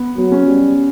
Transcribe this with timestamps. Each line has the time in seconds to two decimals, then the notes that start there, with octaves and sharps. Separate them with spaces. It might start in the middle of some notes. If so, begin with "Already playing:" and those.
Already playing: B3
0.17 F#3 B3
0.32 C#4
0.47 G3